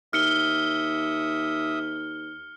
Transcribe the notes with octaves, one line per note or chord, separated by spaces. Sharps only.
D#2 E5 D#6 F6 C#7 G7